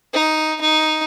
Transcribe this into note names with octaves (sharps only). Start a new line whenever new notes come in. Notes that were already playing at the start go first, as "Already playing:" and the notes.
D#4
D#4